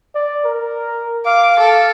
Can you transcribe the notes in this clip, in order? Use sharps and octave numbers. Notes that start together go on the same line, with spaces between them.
D5
A#4
F5 D6
A4